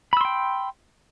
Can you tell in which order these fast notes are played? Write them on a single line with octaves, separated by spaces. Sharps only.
B5 E6 C6 G5